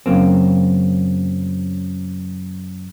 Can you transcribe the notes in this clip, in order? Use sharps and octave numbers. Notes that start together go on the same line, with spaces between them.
F#2 C#3 F#3 A#3 C4